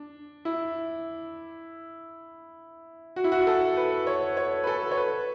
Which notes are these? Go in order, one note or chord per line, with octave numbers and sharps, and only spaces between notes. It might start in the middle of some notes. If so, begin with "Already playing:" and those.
Already playing: D4
E4
F#4
E4
F#4
A4
B4
C#5
C#5
B4
A4
C#5
B4